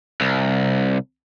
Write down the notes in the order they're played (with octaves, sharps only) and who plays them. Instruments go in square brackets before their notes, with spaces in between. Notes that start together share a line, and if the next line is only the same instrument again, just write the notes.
[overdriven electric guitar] C2